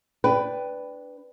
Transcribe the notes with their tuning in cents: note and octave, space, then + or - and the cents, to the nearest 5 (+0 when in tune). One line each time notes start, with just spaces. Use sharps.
D4 -5 B4 +10 G5 +0